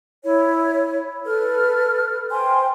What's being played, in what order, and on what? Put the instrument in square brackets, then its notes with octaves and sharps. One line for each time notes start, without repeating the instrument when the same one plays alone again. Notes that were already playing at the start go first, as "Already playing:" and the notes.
[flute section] E4 C#5
A4 B4 F6
C5 G5 G#5 C6